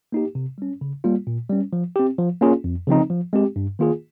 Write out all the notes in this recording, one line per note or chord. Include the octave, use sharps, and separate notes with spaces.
A#3 D#4 G4
C3
G3 C#4
C#3
G3 A#3 F4
A#2
G3 C#4
F3
C4 G4
F3
A#3 C#4 F4 G#4
F2
C#3 F3 C4 D#4
F3
G#3 C4 G4
G2
D#3 A#3 F4 G#4